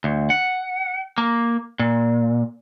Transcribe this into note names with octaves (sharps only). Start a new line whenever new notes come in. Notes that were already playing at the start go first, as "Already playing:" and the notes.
D2
F#5
A#3
A#2